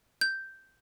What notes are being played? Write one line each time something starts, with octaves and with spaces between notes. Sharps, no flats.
G6